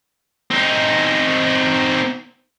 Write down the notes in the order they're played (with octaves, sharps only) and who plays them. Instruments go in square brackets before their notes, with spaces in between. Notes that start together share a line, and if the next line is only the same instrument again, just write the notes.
[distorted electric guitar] C4 D#4